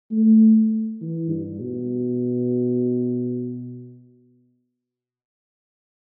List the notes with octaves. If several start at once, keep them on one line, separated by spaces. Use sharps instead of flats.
A3
E3
G2
B2